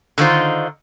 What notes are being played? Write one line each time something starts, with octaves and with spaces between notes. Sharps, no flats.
D3 D#3 D#4 F4 C5